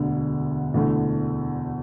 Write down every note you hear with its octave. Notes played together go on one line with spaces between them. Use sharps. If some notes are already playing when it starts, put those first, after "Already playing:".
Already playing: E1 D2 D3
E1 D2 D3 A3 E4